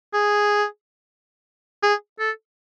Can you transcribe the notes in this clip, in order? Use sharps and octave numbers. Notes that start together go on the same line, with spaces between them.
G#4
G#4
A4